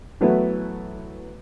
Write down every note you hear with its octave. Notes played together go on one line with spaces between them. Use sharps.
E3 F#3 A3 B3 E4